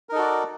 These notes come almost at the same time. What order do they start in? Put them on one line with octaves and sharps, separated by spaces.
A#4 D#4 A4 F#4 D5